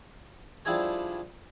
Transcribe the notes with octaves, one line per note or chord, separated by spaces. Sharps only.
F3 G3 D4 E4 G#4 C#5